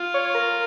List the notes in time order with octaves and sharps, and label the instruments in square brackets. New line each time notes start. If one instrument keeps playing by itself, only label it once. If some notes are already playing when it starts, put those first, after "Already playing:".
Already playing: [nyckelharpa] F4
[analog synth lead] C#5
A#4